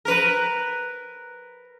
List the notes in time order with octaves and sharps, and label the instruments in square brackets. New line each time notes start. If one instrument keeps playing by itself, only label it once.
[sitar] A#4 B4